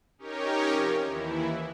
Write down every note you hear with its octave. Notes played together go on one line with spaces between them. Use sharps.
C#4 D#4 G4 A#4 C#5
C3 F3
D#2 E3 E4